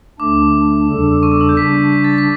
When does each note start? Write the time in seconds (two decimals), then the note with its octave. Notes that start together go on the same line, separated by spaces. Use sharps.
0.19 D2 D3 A3 D4 D6
0.88 E2 C#3 G3 D4 A4
1.23 C#6
1.32 D6
1.41 E6
1.49 G6
1.57 C#3 G3 D4 B6
1.92 B6
2.04 A6
2.18 B6